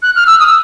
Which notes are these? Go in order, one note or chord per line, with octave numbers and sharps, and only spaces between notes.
F#6
F6
E6
D#6
E6